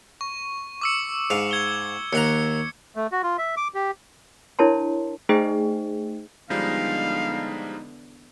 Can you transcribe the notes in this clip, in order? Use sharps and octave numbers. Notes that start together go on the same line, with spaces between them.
C#6
D6 E6 C#7
G#2 F5
G#6 G7
D#2 F#5 A#5 C#7
A3
F#4
F4
E5
D6
G4
D4 E4 A#4 C#5 A5 C6
A3 D#4 G#4 C5 D#5 G5
E2 D3 F3 G3 G#3 D#4 F5